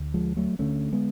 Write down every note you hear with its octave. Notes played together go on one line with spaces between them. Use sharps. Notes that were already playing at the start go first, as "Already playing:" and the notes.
Already playing: D2
F3 G#3
F#3 A3
D2 D3 A3 C#4
G#3 B3